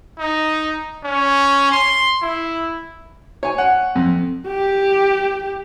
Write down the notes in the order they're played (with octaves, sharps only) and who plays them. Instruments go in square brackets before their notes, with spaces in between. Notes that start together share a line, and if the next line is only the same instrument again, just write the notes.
[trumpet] D#4
C#4
C6
E4
[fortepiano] C#5 G#5
[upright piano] F#5
[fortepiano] F2
[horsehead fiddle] G4